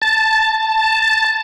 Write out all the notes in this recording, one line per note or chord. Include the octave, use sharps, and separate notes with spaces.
A5